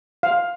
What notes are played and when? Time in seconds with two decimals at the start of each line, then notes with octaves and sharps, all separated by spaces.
0.23 F5